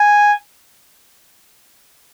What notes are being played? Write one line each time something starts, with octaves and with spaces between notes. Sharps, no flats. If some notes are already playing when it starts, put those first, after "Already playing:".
Already playing: G#5